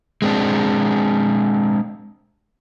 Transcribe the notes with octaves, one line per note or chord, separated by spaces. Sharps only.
G#3 C4 D4